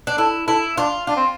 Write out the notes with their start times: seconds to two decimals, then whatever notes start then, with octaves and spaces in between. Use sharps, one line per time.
0.07 D4
0.18 E4 A4
0.48 E4 A4
0.77 D4 F4
1.07 D4 F4
1.17 C4